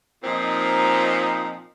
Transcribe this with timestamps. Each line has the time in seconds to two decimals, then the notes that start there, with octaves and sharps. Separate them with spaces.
0.22 A#2 F3 C4 D#4